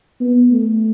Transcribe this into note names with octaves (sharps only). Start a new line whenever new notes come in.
B3
A3